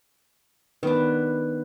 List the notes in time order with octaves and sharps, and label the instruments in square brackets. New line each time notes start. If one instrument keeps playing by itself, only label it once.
[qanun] D#3 D4 [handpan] B3 B4